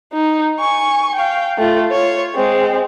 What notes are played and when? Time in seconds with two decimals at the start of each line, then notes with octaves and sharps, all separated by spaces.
0.13 D#4
0.59 G#5 C#6
1.15 F5 G5
1.58 A3 F4
1.91 F4 C#5
2.35 G#3 C4